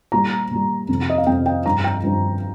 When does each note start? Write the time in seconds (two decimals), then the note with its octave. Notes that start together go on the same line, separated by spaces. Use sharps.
0.12 A#2 G3 A#5
0.51 A#2 G3
0.88 F2 C3 F3
1.10 D#5
1.18 F5
1.26 F2 C3 F3 G5
1.46 G5
1.66 G2 F3 A#5
1.84 G5
2.03 G2 F3